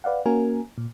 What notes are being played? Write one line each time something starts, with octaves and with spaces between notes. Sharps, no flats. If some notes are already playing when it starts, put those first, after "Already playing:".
B4 D5 F5 F#5
A#3 C#4 F#4 A#4 G#5
A#2